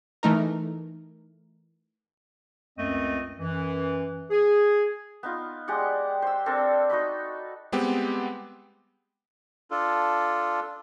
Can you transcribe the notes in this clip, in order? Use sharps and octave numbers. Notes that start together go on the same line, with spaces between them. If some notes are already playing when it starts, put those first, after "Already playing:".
E3 A3 D#4 A#4
C#2 F#2 A3 C4 D#5
F#2 E3
G#4
B3 D#4 F4
G#3 G4 D5 F#5
C5 E6
C4 D4 A4 A#4
D#4 F#4 D#5 B5
G3 G#3 B3 C4 G4
D4 F4 A4